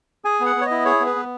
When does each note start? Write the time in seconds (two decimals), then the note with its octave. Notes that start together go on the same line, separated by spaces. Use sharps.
0.25 G#4 G#5
0.40 B3
0.46 F#5
0.56 B3
0.61 C#5
0.66 E4 D#5
0.85 G#4 C#5
1.00 B3
1.06 B4
1.16 B3